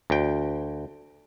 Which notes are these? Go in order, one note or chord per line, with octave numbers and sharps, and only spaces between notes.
D2 G5